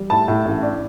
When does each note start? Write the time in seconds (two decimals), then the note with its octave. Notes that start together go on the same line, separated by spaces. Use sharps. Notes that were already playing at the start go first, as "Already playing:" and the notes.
Already playing: G3
0.10 A2 A5
0.28 A2
0.45 A1
0.63 D4